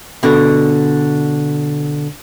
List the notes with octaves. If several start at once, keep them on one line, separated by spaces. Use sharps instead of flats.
B2 D3